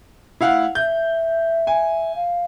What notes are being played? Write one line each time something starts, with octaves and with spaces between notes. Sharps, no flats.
A3 E4 F5 F#5
E5 G6
G#5
F5